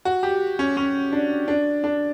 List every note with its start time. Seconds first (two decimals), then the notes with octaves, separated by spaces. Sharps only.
0.05 F#4
0.23 G4
0.59 C#4
0.77 C#4
1.12 D4
1.48 D4
1.84 D4